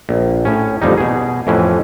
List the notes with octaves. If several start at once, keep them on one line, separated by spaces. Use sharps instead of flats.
A#1
A2 C#4
A1 F2 G3 D#4
B2 G#4
F2 A2 E3 C#4